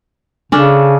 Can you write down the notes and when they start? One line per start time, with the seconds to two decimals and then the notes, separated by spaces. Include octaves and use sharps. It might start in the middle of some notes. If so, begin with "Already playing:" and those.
0.52 C#3 C#4 D4 A4